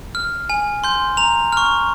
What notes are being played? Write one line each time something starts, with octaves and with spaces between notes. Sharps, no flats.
F6
G#5
C6 G6
A#5 F7
C#6 F6